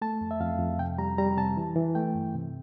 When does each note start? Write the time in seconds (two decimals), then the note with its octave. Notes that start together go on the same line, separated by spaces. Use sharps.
0.02 A3 A5
0.21 F2
0.31 E5
0.41 F2 F5
0.59 F2
0.79 C3 G5
0.98 G3 A#5
1.18 G3 A#5
1.37 C3 A5
1.57 E3
1.76 E3
1.95 A3 G5
2.15 G2
2.35 C3